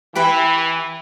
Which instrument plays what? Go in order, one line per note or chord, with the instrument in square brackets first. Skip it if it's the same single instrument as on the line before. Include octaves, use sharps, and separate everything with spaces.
[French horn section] E3 [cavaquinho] G4 B4 B5